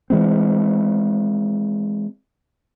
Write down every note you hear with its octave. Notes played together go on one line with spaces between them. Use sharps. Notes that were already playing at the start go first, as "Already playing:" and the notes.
E3 G#3 C4